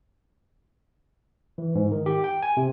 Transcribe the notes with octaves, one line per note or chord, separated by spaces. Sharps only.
E3
G#2
D#3
G4
G5
G#5
C3